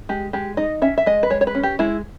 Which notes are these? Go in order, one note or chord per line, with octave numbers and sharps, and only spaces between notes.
G#3 G4
G#3 G4
D#4 D#5
C#4 E5
E5
G#3 D#5
B4
G#3 C#5
C#5
B4
C#4
G4
G#3 E4